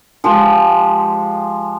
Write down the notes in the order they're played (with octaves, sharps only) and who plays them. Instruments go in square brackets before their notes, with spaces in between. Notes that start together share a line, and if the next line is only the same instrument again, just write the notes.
[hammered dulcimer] F3 G#3 G4 C5